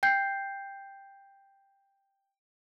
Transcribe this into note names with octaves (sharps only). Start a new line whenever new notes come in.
G5 G6 C7